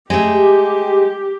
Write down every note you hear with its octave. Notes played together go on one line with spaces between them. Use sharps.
G#3 A3 G4